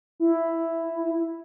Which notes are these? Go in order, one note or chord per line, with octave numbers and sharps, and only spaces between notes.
E4